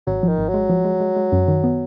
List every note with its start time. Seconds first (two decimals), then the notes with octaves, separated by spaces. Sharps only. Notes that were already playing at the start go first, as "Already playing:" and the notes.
0.07 G#1 F#3
0.23 D#3 F3
0.39 G#1
0.48 F#3
0.54 G#3
0.70 F3
0.85 G#3
1.01 G#3
1.16 G#3
1.32 F#2
1.48 D#3
1.64 B3